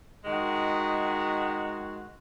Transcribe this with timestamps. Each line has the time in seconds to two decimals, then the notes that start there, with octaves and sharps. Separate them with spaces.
0.25 D#3 G#3 F#4